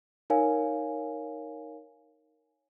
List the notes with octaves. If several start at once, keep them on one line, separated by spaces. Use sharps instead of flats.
D#4 A#4 C#5 F5 G#5